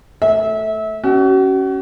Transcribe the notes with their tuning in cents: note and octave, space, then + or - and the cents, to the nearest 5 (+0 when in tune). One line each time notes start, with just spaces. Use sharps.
A3 +0 E5 -25
C#4 +0 F#4 +35